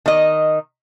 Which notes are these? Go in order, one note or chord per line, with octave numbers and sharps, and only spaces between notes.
D#3 D#5